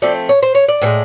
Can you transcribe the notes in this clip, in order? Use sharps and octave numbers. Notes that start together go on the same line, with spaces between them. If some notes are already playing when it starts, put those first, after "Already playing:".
F3 A3 C4 D5
C#5
C5
C#5
D5
A2 E3 G#3